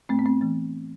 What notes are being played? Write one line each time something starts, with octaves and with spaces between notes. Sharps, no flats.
A2 A3 C4
B3
A3 C4
E3 A3